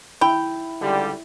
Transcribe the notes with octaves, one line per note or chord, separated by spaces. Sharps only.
E4 G5 B5
C#2 D3 G3